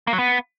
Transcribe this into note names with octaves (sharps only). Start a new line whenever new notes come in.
A#3
F#3
B3